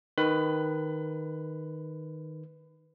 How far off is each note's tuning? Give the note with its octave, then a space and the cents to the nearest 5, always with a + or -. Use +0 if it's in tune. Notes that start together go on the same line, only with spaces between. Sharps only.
D#3 +0 B4 +0 B5 +30